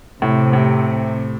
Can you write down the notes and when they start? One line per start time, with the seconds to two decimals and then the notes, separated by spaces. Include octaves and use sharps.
0.22 A2 C3
0.53 A2